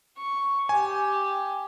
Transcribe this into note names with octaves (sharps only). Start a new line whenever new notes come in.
C#6
G4 G#5